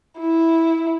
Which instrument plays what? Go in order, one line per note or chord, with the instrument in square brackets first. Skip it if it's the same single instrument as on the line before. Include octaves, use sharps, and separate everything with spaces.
[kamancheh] E4